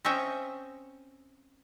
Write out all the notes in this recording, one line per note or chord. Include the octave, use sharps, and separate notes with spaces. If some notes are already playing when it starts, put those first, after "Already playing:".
C4 C#4 C#5 D#5 E5 G5